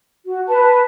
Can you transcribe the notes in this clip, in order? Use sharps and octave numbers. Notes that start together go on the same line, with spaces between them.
F#4
B4 A5